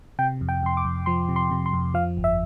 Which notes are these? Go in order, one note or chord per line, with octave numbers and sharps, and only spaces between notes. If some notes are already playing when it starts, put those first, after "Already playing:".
C3 G5
F2
G5
F2 C6
D6
F2
F3 C6
C3
C6
C3
C6
F2
F3 F5
G1
E5